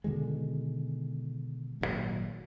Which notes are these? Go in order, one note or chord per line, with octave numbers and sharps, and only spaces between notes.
B2 D3 D#3 G#3
G#1 G2 A#2 F#3